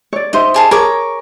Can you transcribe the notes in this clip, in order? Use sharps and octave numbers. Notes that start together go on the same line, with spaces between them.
C#5 D5
D#4 C5 D#5 E5
G4 G#4 A5
G#4 A#4 C#5 D6